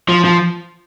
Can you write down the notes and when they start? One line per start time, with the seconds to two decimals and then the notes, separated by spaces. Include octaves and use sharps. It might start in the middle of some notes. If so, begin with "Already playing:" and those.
0.09 F3
0.25 F3